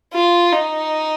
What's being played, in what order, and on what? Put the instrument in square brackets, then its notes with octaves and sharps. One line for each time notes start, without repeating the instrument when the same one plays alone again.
[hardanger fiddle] F4
D#4